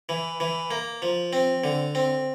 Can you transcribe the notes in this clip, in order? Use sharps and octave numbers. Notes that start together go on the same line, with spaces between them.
E3
E3
A#3
F3
C4
D3
C4